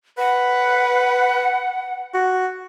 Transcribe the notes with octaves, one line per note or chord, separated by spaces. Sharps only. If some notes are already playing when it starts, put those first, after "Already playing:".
B4 F#5
F#4